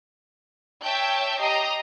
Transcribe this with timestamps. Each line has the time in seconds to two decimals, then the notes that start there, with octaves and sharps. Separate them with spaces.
0.82 C#5 E5 G5 A5 G6
1.41 G4 D#5 A#5 D#6 C7